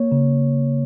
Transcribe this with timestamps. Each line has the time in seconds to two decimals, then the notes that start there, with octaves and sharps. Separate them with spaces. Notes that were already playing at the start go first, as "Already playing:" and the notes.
Already playing: A#3 C#5
0.12 C#3